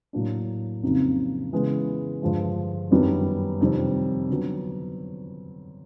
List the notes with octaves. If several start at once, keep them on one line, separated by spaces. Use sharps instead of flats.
A2 F#3 A#3 D4
F2 C#3 F#3 A#3 D#4
C#3 E3 G#3 B3
G2 D3 F3 G#3
F#2 D#3 G3 B3 D4
F2 C3 D#3 G3 C4
D3 F#3 B3